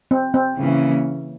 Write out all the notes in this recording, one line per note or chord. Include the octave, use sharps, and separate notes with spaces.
C4
C4
C#3 E3 A#3 C#4